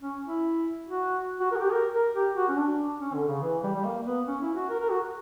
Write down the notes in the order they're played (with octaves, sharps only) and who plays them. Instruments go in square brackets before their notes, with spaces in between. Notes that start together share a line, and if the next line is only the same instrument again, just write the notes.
[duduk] C#4
E4
F#4
F#4
A#4
F#4
G4
A#4
A#4
G4
F#4
C#4
D4
C#4
D3
C#3
E3
G3
G3
A#3
B3
C#4
E4
F#4
A#4
A#4
F#4